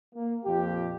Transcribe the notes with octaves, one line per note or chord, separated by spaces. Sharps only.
A#3
F2 A#2 G4